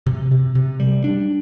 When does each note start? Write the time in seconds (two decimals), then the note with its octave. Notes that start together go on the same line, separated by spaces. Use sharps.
0.07 C3
0.31 C3
0.55 C3
0.80 G3
1.04 D4